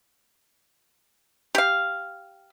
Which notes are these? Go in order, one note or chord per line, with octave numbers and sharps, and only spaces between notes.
G4 F5